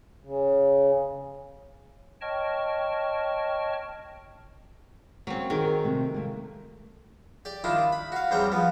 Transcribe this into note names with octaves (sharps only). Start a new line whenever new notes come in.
C#3
C#5 D#5 G5 A5 C#6 F6
F#3 A#3 C4 C#4
D#3 G#4 A#4
C3 A3
A3 A#3
G4 D5
D#3 D4 E4 F4
B5
F#4 F5
E2 G3 C4 C#4 G5 A#5
F3 B3